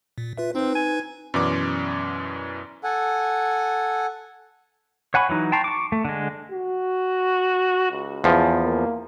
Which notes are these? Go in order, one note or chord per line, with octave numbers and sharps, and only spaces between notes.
A#2
F4 B4 E5
C4 D#4 B4
G#5
F#2 B2 E3 C#4 D5 D6
A4 F#5 G#5
C#5 F#5 G#5 B5 C#6
E3 F#3 D#4
G5 A5 A#5 C6 C#6
C#6 D6
A3
D3 G#3
F#4
C#2
E2 F3
A#3